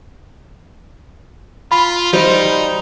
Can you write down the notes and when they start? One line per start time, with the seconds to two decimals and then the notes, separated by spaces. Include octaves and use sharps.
1.72 F4 B5
2.13 G3 D#4 C5